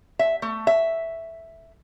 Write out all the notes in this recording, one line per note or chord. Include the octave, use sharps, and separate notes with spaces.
E5
A3
E5